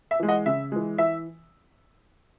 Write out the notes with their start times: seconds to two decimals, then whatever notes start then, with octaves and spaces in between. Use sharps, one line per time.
0.11 E5
0.20 E3 G#3
0.28 D#5 F#5
0.46 C#3 E5
0.72 E3 G#3
0.98 E3 E5